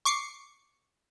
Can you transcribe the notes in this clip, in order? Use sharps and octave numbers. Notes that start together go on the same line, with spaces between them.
C#6 D6 C7 C#7